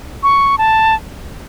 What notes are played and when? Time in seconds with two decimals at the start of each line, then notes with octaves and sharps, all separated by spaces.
0.23 C#6
0.58 A5